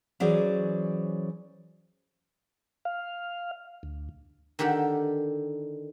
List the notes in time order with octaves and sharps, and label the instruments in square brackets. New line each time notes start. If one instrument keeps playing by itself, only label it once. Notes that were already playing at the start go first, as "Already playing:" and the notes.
[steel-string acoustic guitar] E3 F#3 C#4 G#4 C5 D5
[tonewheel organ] F5
D2
[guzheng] D3 D#3 G4 A4 F#5